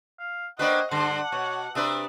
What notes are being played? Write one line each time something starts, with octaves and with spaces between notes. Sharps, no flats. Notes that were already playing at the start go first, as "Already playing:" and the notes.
F5
A#3 D4 B4 C5 D#5 F#5 G5 C#6
G2 D3 F#5 A5 C6 D6
B2 C#5
C3 D4 B4 E5 D#6